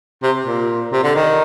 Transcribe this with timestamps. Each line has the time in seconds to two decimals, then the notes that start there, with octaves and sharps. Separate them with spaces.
0.23 C3
0.46 A#2
0.93 C3
1.03 D3
1.15 D#3